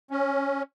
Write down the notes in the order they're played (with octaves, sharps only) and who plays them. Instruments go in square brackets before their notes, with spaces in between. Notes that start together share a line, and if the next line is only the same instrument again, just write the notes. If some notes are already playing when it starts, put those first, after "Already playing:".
[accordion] C#4